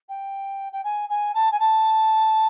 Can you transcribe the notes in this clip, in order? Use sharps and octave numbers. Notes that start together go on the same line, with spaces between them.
G5
G5
G#5
G#5
A5
G#5
A5